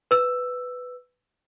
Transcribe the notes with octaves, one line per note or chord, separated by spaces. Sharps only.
B4 E6